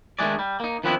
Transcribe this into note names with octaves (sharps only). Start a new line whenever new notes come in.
D#3 G#3 A3 D4 G#4 D5
G3
A#3 D#4
D#3 F3 B3 C4 D4 E4